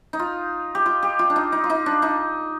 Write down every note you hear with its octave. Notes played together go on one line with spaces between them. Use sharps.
D#4
F4
G4
F4
G4
F4
D4
D#4
D#4
F4
D#4
D4
D#4